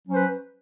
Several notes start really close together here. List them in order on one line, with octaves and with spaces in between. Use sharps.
F#3 C#4 C5 B4